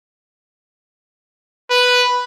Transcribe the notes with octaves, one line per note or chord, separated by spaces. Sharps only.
B4